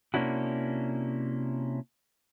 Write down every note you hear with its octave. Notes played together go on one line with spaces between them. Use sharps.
C3 A#3 C#4 D4 E4 F#4